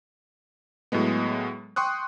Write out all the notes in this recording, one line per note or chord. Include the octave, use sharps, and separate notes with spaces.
A2 F#3 G#3 B3
G5 C6 C#6 D#6 F#6